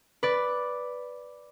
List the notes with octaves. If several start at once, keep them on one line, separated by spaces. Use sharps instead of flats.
B4 D5